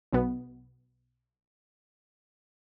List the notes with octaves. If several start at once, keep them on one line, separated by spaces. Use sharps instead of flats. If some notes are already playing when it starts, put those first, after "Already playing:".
B1 B2 B3